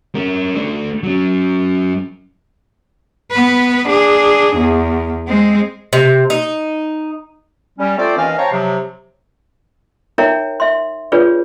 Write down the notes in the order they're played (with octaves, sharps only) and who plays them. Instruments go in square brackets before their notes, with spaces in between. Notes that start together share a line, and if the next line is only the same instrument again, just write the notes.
[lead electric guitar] C#4 A#4
A3 D4
F#3 C#4
[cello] B3 B4
D4 G#4
E2
G#3 C4
[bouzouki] C3
D#4
[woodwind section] G3 C#4
A3 C4 F4 C5 D5
D#2 E3 C#4 D#5 F5
C5 C#5 F5 G5 A5 A#5
C3 F3 F#3
[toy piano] D#4 A#4 C#5 E5 G5 A#5
E5 C6
D4 F4 G#4 B4 C#5 D5